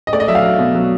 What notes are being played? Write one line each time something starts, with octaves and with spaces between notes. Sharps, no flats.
D#5
A3 D5
D#5
F#3 E5
F5
F#3
B2
F#3